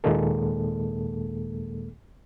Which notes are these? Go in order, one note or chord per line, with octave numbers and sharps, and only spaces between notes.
D#2 A#2 D#3 G#3 A#3 A4